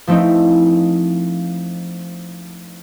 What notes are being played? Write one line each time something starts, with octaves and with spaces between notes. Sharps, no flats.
F3 A3 C4 D#4 E4